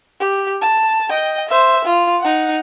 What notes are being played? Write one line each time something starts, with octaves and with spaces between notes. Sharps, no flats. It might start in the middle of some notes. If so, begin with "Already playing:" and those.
G4
A5
D#5 G5
C5 E5
F4
D#4 F#5